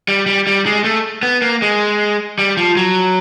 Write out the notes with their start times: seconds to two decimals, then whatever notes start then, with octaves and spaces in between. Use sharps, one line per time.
0.08 G3
0.26 G3
0.47 G3
0.66 G#3
0.84 A3
1.23 B3
1.42 A#3
1.62 G#3
2.39 G3
2.57 F3
2.77 F#3